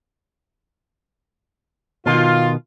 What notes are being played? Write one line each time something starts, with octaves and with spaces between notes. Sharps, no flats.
B2 D#3 F4